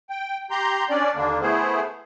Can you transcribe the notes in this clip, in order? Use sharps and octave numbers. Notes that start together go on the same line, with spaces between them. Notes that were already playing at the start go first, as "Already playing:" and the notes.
G5
G4 A#5 C6 G6
C#4 D4 D5
D#2 D3 A#3 D4
A3 B3 E4 G#4 C5